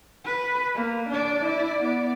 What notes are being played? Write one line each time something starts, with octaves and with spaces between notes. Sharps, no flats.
B4
A#3
D4 D5
E4 D5
B3 D5